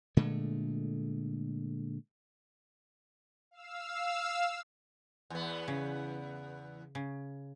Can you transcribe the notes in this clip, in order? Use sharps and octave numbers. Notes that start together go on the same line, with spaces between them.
A#2 D3 G#3 A3
F5 E6
E2 B3
C#3
C#3